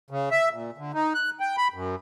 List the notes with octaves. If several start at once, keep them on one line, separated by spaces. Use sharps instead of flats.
C#3
E5
A#2
D3
D#4
F#6
G5
B5
F#2